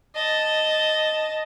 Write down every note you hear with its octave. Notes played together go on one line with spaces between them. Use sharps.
D#5 A5